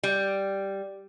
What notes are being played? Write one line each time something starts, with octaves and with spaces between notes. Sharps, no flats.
G3